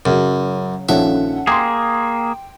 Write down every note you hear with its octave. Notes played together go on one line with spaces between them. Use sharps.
F#2 C#3 F#3
A#1 D#3 F3 C#4 A4 E5 F#5
A#3 G#4 G5 C6 D6